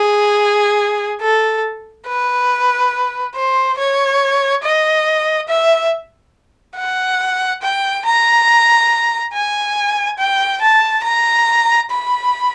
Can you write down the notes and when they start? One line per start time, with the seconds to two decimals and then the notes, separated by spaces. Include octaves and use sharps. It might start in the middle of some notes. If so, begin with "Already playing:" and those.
Already playing: G#4
1.21 A4
2.07 B4
3.35 C5
3.78 C#5
4.63 D#5
5.48 E5
6.76 F#5
7.62 G5
8.05 A#5
9.33 G#5
10.18 G5
10.62 A5
11.03 A#5
11.90 B5